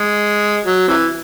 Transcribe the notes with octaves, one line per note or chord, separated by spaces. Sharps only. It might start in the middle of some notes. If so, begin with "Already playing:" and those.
Already playing: G#3
F#3
C3 E3